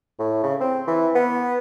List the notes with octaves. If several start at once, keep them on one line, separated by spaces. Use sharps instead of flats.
A2
C#3
C4
E3
B3